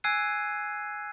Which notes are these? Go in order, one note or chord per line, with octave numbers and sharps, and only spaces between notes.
G#5 E6 F#6 G#6 C7 D#7